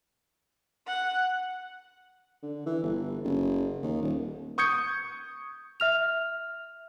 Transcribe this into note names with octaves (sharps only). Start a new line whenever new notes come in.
F#5
D3
E3
G1
F#1
D#2
D#1
C#6 D#6 G6 G#6 C#7
E5 F6 F7